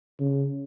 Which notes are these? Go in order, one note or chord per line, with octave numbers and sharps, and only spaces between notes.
C#3